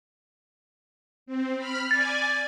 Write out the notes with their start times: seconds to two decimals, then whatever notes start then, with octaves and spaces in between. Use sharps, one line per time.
1.26 C4
1.57 B5 F6
1.91 D5 G#5 A6